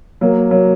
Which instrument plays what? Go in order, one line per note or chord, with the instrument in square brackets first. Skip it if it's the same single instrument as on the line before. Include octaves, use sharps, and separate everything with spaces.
[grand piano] F#3 A#3
F#3 A#3